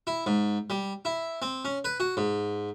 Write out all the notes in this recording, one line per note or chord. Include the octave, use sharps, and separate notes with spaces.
E4
G#2
G3
E4
C4
C#4
B4
F#4
G#2